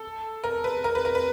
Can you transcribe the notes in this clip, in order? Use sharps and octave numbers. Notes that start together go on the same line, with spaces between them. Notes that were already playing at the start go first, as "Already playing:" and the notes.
Already playing: A4
A#4
B4
A#4
B4
A#4
B4